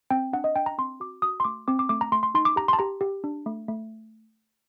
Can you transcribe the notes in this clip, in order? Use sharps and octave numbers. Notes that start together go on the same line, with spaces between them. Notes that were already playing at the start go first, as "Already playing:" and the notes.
C4 G5
D4 F#5
D#5
D4 G5
A#5
C4 C6
F#4 D6
F#4 D#6
C6
A3 D6
C4 D6
D6
A3 D6
A#5
A3 C6
C6
D#4 C6
D6
G4 A#5
A5 C6
G4 A#5
G4
D4
A3
A3